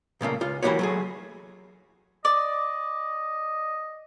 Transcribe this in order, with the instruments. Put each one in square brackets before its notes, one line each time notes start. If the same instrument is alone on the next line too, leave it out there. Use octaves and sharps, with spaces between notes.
[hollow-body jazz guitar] A#2 C#3 A3 A#3
C#2 F4
E3 A#3 D#4 F#4 G4 C#5
F#3 A3 G#4
[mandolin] D5 [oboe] D#5